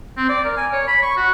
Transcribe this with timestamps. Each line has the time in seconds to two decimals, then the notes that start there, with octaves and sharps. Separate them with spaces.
0.17 C4
0.29 D5
0.44 A#4
0.56 G#5
0.72 C#5
0.87 B5
1.02 C#6
1.17 F#4